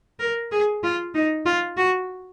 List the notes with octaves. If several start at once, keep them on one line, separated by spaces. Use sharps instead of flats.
A#4
G#4
F4
D#4
F4
F#4